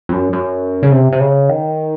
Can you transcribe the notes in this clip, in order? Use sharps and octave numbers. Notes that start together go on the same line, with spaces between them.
F2
F#2
F#2
C#3
C3
C3
C#3
D#3